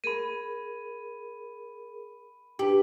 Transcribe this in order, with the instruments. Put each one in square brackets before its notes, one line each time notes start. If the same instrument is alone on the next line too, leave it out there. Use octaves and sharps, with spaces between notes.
[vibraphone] G#4 A#4 [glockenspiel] B5 D#7
[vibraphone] D4 B4 [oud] G4